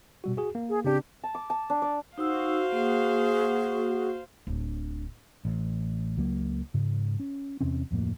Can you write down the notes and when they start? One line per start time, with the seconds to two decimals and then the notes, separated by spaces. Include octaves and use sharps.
0.24 B2 G3 F#4
0.37 F#4 G#4
0.55 A#3
0.69 G#4
0.84 C#3 C4 D4 G4
1.23 A5
1.35 D6
1.50 A5
1.70 D4
1.82 D5
2.18 D#4 F#4 C5 F5 E6
2.72 A#3 G#4
4.47 D1 D4
5.45 A1
6.17 C#2 F#3 A#3
6.74 G#2 C#3
7.20 C#4
7.61 E2 C3 C4 C#4
7.91 D1 F2 A2 A#3